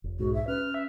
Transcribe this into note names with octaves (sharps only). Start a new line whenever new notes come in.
F1
B1 G#2 F#4
E5
C#4 B4 F6
E5